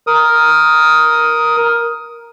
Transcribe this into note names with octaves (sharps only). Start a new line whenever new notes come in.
A#4 D#6